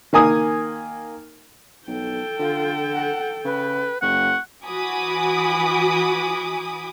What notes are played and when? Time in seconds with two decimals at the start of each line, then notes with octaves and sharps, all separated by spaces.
0.13 D#3 A#3 G#5 D#6
1.88 B1 A4 G5
2.39 D3 F4
2.93 F#5
3.45 C#3 B4
4.02 F#1 F#5 C#6
4.67 E3 F#4 G#5 B5 D6 D#6